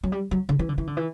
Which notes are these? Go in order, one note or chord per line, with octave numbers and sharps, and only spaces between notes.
F#3
G3
F#3
D3
E3
D3
E3
D3
E3